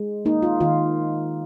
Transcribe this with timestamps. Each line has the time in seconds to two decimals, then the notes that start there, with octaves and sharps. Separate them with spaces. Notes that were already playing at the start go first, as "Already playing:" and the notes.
Already playing: G#3
0.25 A#3 D#4
0.42 F4
0.60 D#3 F4